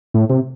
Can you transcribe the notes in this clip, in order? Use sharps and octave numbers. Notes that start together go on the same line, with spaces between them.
A2
C3